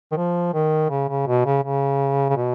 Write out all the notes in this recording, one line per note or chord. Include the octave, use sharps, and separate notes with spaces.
D#3
F3
D#3
C#3
C#3
B2
C#3
C#3
C#3
B2